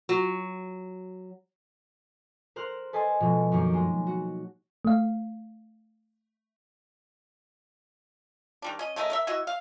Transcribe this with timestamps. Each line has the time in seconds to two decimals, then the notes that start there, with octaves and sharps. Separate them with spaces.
0.09 F#3
2.56 A#4 C5 F6 F#6
2.93 A4 B4 C5 D#5 G#5 A5
3.21 B2 F3 G#3
3.52 F#2 D#3 A#3
3.73 G#3
4.07 F#4
4.85 A3 F5
8.62 D#3 G3 D4
8.79 C#4 D#5
8.96 C#3 A3 A#4 D#5
9.10 A#4 D#5 E5
9.27 E4 F#4 D#5 E5
9.47 F5